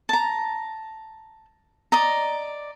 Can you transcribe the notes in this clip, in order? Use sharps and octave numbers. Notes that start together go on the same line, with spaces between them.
A5 A#5
D5 D#5 A#5